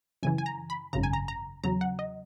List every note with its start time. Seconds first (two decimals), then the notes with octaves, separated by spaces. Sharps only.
0.23 F#2 C#3 E3 G#5
0.38 G#5
0.46 A#5
0.70 B5
0.93 G#1 F#2 C#3 A#5
1.03 G#5
1.13 A#5
1.28 A#5
1.64 E2 C#3 F#3 A#5
1.81 F#5
1.99 D#5